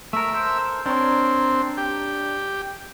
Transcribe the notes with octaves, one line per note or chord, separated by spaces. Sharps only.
A3 A#4 E5
A4 A#4 C5
C4 D4 A#4 C#5
G4